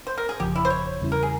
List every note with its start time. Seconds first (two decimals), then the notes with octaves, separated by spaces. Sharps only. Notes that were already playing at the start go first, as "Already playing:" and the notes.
0.07 C5
0.18 A#4
0.29 G#4
0.40 G1 F2 C#3 F3 G4
0.55 E4
0.65 C5
0.70 C#5
1.01 E2 C#3 G3 C#4 E4
1.12 A#4
1.23 G#4